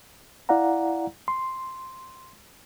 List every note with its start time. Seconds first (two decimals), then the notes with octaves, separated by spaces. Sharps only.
0.49 E4 D5 F5 F#5 A#5
1.28 C6